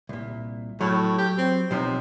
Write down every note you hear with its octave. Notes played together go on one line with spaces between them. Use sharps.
C2 A#2
A2 F#3
G4
C4
B1 C3 F3 D#4